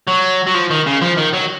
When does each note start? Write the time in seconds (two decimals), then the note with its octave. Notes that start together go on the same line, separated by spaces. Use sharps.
0.07 F#3
0.47 F#3
0.54 F3
0.70 D#3
0.86 C#3
1.01 F3
1.17 D#3
1.33 F#3